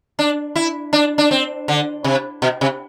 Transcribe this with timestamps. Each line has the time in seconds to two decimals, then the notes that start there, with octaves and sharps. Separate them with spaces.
0.19 D4
0.56 E4
0.93 D4
1.18 D4
1.31 C4
1.68 D3
2.04 C3
2.42 B2
2.61 C3